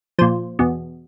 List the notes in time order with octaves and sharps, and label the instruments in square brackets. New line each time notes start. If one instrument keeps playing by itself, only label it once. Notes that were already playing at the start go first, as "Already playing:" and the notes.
[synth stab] A#2 F3 C5
E2 B2